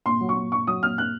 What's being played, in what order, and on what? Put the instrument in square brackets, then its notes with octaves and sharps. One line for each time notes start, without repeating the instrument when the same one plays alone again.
[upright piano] A#2 C6
F#3
C#6
A#2
A#2 C#6
F#3 D#6
A#2 F6
A#3 F#6